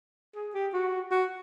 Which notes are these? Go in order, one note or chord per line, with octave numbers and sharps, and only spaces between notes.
G#4
G4
F#4
F#4